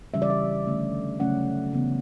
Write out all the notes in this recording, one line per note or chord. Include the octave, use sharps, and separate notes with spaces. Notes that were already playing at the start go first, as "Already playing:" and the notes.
C#3 E3 G3 C#4 E5
D5
E5
D3 A3 C#4
C#3 F#3 A3 C#4 F#5
C#3 E3 B3